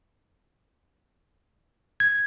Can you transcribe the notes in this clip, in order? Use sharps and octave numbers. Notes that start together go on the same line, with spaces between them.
G#6